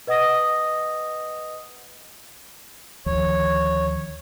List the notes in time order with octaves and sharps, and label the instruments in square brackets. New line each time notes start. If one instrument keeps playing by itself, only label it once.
[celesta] B4 D#5 F#5 D#6 A#6
[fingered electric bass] D2 D#3 F3 [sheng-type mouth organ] C#5